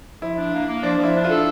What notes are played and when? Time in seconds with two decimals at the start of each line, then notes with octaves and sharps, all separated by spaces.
0.21 F3 E4
0.37 D4
0.52 A#3
0.68 A#3
0.83 F3 D4
0.98 F3
1.03 E4
1.14 D4
1.24 F4
1.29 A4